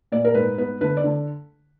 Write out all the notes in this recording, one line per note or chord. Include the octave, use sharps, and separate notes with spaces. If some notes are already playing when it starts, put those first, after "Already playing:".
A#2 D5
A#4
G#2 B4
B3 B4
D3 B4
D5
D3